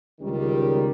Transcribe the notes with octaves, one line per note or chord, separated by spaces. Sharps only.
C#2 D#3 G3